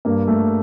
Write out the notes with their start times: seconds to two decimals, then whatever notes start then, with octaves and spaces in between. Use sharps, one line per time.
0.05 G2 A#3
0.28 A3